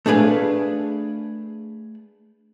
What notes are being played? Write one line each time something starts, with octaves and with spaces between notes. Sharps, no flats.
A3 D4 G#4 B4 F5